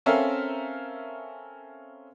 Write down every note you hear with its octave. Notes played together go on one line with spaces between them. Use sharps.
C4 C#4 A4 A#4 E5 F5